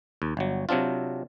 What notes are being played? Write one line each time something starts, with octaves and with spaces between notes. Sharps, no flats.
D#2
G1 F#3
C3 F#3 C4 D4 F4